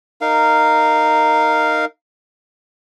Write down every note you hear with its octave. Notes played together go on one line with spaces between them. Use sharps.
D#4 A#4 F5